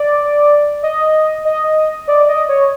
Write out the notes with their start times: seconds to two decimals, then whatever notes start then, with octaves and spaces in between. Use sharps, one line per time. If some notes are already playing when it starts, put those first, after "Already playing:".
Already playing: D5
0.83 D#5
1.45 D#5
2.08 D5
2.28 D#5
2.49 C#5